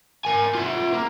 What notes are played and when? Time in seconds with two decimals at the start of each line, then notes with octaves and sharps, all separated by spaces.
0.25 A#4 G#5
0.55 F4 E5
0.93 A#3